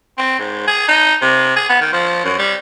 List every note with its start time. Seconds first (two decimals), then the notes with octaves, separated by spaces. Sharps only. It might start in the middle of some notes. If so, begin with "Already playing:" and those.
0.18 C4
0.39 G#2
0.67 G#4
0.88 D#4
1.22 C3
1.56 G#4
1.69 B3
1.81 D#3
1.93 F3
2.24 F#2
2.39 G3